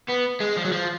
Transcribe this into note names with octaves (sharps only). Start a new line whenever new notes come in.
B3
G#3
F3
F#3
F3